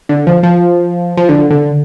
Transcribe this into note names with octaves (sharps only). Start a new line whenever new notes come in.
D3
F3
F3
F3
D3
D3